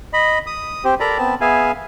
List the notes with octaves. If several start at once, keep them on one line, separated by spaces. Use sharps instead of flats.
D#5 B5
D#6
C4 G4 C5
A4 A#4 D5 A#5 B5
B3 C4 A5
B3 G#4 E5 F5 G#5